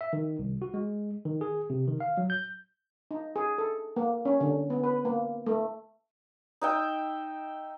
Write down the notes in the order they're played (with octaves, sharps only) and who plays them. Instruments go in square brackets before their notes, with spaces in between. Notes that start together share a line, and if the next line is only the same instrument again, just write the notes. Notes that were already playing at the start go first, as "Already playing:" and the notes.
[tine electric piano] E5
D#3
C2
F#4
G#3
D#3
G#4
C3
D#3
F5
F#3
G6
[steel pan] D#4
G#4
A4
A#3
C#4
D3
B3
B4
A#3
A3
[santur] D#4 E5 G5